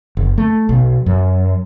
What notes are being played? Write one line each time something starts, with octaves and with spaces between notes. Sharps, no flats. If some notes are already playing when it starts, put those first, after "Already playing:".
F#1
A3
B1
F#2